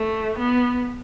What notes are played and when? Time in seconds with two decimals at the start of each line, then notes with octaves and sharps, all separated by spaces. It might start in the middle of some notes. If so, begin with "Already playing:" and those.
Already playing: A3
0.38 B3